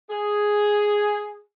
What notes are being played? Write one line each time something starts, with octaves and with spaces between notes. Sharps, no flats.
G#4